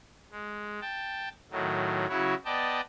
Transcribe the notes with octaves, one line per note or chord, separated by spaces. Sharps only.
G#3
G5 A5
A2 D#3 F#3
C#3 F#3 E4 F#4 C#5
B3 D5 D#5 G5 A5